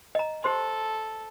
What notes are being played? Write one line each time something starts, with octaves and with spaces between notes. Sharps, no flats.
D#5 A#5
G4 A4 C5 C6